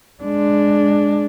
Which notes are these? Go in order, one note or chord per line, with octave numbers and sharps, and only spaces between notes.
G#3 D4